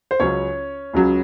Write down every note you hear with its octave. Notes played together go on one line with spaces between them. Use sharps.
C5
C#2 C#3 F#3 C#4 C#5
C#2 C#3 F#3